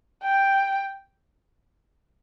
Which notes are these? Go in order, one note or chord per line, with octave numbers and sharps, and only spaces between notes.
G5